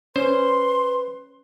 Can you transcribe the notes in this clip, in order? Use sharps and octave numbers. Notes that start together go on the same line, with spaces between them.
C#4 B4 C5 C6